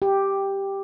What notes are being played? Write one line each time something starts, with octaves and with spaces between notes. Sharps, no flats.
G4